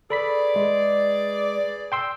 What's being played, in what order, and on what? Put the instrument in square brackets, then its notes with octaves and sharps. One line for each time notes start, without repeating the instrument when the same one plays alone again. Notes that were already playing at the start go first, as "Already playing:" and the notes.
[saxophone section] G#4 B4 D5 [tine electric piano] A4 B5 B6
[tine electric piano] G#3
G5 C6 E6